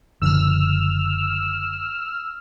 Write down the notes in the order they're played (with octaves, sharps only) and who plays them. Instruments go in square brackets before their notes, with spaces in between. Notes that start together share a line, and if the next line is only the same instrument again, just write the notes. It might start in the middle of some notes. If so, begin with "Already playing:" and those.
[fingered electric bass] F#1 D3 F3 [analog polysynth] E6 F6